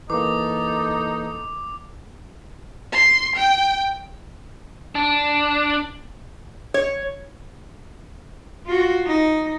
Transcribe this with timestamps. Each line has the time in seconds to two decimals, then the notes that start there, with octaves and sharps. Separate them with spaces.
0.10 E3 A#3 D#4 A4 D6
2.92 C6
3.36 G5
4.95 D4
6.74 C#5
8.66 F4 F#4
9.06 D#4